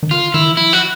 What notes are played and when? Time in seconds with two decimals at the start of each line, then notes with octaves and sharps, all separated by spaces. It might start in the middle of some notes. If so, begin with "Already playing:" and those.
0.03 D#3
0.11 D3 F4
0.34 D#3 E4
0.51 E3
0.57 F3 E4
0.73 F#4